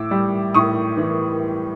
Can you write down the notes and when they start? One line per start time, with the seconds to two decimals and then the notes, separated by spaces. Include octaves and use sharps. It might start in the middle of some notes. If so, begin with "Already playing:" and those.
Already playing: A2 D6 E6
0.11 G3
0.54 A2 C#6 D#6
0.97 E3